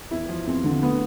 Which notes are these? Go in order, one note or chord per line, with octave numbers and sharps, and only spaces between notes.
E2 E4
F3
E2 C4
D3
A3 B3